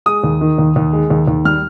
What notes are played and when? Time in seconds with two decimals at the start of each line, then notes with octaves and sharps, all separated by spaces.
0.06 G#3 D#6
0.23 D#2
0.41 D#3
0.58 D#2
0.76 D#2
0.93 G#3
1.10 D#2
1.27 D#2
1.45 G3 F6